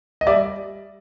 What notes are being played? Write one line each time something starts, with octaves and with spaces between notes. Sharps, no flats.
D#5
G3 D5 E5